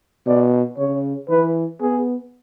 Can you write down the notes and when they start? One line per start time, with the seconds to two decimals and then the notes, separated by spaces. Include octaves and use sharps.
0.26 B2 D5
0.78 C#3 C#5
1.29 E3 B4
1.81 B3 G#4